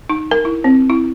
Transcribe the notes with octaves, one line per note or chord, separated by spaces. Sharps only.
D#4
A#4
E4
C4
E4